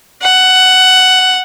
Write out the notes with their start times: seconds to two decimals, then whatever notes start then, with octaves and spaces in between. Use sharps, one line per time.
0.23 F#5